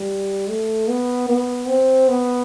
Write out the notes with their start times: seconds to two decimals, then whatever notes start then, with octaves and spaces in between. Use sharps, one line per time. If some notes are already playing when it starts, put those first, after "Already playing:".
Already playing: G3
0.49 A3
0.88 B3
1.29 B3
1.68 C4
2.08 B3